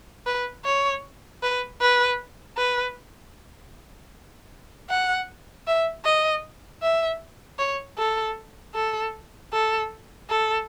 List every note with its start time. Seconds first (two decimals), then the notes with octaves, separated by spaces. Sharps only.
0.26 B4
0.65 C#5
1.43 B4
1.81 B4
2.58 B4
4.90 F#5
5.67 E5
6.05 D#5
6.82 E5
7.59 C#5
7.98 A4
8.75 A4
9.53 A4
10.30 A4